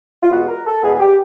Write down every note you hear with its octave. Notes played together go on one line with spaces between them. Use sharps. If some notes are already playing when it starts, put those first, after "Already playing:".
F4
E2 B2 G#3 B3 F#4
A#4
A4
E2 B2 G#3 B3 G#4
G#4
G4